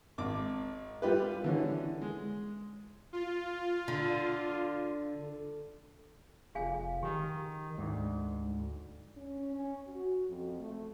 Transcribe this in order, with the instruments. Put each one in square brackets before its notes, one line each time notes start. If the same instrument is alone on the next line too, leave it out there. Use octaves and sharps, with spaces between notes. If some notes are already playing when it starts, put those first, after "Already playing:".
[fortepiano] G#1 D6
G3 F4 G4 B4
D3 E3 C#4
G#3
[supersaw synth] F4
[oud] D3
[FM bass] F1 [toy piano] G#4 F5 G#5
[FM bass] D#3 [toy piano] G4
[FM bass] D2 [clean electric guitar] G#2
[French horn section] C#4
C#4
F#4
F2
A3